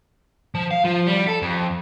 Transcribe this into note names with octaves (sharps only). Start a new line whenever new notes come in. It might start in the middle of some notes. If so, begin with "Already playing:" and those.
F3
F5
F3
G3
A4
F2